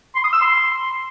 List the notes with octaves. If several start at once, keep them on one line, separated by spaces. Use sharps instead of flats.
C6
D#6
E6
C6